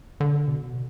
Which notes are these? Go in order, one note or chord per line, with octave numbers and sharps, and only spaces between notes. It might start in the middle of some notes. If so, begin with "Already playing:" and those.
D3
B2